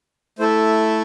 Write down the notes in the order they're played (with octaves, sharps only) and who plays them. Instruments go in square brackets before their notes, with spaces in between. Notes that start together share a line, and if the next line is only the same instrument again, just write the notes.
[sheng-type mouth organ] A3 E4 A4 C5